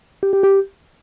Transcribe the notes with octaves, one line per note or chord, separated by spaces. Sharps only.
G4
G4
G4